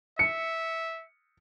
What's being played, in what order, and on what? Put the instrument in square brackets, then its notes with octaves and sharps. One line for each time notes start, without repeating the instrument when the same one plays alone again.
[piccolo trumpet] E5 [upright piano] C#7